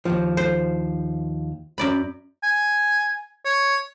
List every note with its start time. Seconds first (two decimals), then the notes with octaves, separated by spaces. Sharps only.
0.05 D#2 G#2 F3
0.37 C5
1.78 F#2 D5 B5
2.44 G#5
3.45 C#5